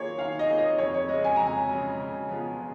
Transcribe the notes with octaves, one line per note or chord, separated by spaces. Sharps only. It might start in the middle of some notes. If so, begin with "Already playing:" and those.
Already playing: D#3 A#3 F4 G#4 C#5
D#3 F5
D#5
A#3 F4 G#4
D#5
F2 C#5
C#5
G#3 D#5
C#3
G#5
F2 A#5
G#5
C#3 G#3
C#3
F3 B3 F4 G#4
C#3